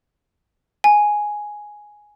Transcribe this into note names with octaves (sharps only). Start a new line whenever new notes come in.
G#5